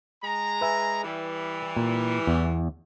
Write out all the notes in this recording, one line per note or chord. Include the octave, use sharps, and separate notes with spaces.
G#3 A#5
B4 E5 G#5
E3 G3
A#2
E2